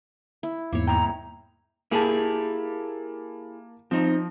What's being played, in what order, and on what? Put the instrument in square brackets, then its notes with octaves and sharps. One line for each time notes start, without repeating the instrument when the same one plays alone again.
[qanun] E4
[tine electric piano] E2 G#2 [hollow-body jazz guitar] A#3 [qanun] E4 C#5
[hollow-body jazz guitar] C2 A#3 G5 [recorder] A#5
[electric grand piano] A#3 A5 [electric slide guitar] E4 G4 G#4
[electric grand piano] F3 [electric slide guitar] C4 D#4